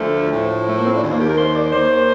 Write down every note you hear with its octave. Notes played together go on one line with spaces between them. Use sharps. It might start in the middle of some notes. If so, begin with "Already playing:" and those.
Already playing: D2 D3 F3 A3
A2 F3
A3
A#3
C4
D4
D#2 D#3
A#3
G4
A#4
C5
D5
D#2 D#3 C5